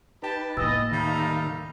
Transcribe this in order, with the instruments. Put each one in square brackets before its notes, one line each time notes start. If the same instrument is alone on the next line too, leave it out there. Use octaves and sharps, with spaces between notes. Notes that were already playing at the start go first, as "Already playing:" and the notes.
[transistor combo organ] D#4 B4 [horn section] G4 A5
[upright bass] A2 A#3 [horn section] E3 D#5 [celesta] E6 A6
[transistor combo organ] D#2 D#3 F5 [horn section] G3 A3 D#4